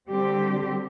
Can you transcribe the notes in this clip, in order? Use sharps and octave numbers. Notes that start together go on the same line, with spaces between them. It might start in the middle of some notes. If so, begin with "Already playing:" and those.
D3 G3 C4 G4